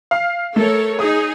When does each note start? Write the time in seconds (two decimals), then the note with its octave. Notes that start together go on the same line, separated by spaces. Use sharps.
0.11 F5
0.56 A3 A4 A#4 C#5
0.99 D#4 G#4 D#6